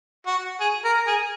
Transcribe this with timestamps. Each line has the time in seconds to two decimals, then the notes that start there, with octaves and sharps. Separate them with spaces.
0.26 F#4
0.60 G#4
0.84 A#4
1.07 G#4